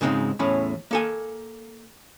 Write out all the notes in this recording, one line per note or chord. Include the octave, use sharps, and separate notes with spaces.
G#2 C#3 G#3 C4 D#4
E2 A2 C#4 B5
A#3 A4 G#5